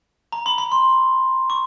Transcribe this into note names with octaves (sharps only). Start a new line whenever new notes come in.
A#5
B5
B5
C6
C#6